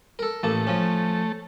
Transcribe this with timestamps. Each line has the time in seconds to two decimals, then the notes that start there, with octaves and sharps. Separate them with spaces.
0.19 A4 A#4
0.43 A1 A3 A#3 A5
0.67 F3 C#4